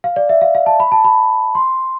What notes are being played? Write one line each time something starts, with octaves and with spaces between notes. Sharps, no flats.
F5
D5
E5
F5
F5
A5
B5
A5
B5
C6